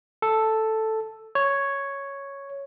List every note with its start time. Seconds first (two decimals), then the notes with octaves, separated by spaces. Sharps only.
0.22 A4
1.35 C#5